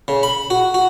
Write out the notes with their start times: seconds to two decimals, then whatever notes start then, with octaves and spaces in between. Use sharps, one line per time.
0.08 C#3
0.23 B5
0.50 F#4
0.74 F#4